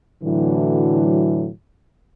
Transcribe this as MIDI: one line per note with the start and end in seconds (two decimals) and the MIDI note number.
0.22 1.49 45
0.22 1.49 50
0.22 1.49 52
0.22 1.49 54